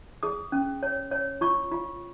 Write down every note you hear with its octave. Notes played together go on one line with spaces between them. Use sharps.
G#4 D#6
C#4
C#5
C#5
F4 C#6
F4